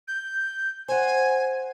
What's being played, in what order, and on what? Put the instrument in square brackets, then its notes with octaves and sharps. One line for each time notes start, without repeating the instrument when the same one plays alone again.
[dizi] G6
[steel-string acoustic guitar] C5 F#5 [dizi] G#5